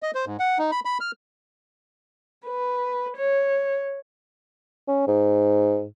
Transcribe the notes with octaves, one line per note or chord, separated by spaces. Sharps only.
D#5
C5
G#2
F#5
D#4
B5
B5
F6
B4
C#5
C#4
G#2